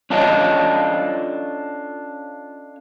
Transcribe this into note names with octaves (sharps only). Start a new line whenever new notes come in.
C#4 D4 F4 A4 C#5 D#5